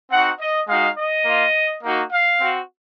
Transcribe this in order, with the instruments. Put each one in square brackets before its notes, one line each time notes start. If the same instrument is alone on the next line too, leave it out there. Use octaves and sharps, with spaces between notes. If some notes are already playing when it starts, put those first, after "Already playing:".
[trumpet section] C4 D#4 F#4 F#5
D#5
G#3 D#4 F#4 F5
D#5
A#3 F4
A#3 D#4 F#4
F5
C4 F#4